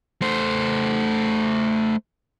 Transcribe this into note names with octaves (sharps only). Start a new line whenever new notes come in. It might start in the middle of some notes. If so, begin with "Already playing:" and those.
A3 C5